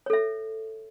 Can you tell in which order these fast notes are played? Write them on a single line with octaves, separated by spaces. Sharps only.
C#5 A4 E5